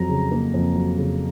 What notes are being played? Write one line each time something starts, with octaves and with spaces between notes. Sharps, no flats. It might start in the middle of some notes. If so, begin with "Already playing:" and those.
Already playing: F2 F#3 A#5
C#3
A#3
F2
F#3
C#3